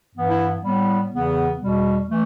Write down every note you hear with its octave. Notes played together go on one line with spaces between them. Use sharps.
G2 E3 B3
E4
A2 G3 B3
E2 C#3 E3 B3
E2 B2 G3
E3 A3